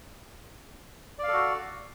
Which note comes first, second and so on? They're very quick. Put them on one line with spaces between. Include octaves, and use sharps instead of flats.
D5 F5 A4 F#4